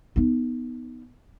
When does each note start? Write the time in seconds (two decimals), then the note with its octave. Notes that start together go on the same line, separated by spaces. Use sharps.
0.16 B3 D#4